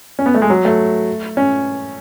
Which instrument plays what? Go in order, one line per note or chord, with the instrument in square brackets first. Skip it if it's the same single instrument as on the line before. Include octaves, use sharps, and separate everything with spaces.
[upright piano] C#4
B3
A3
G#3
F#3
A3
C#4